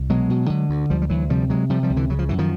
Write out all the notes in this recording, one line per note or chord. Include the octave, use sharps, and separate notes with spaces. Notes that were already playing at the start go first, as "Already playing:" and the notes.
Already playing: C2
B2 F#3 G#3
B2
D3
D2
D2 F3 G3
G3
D2 E3 F#3
C3 F3 G3
C3 F#3 G#3
C3 F3 G3
F3 G3
C#2
D3 E3
C#3 F#3
F3
F#2 E3
D#3 F3